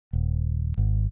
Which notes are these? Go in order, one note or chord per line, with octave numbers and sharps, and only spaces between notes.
D#1
G#1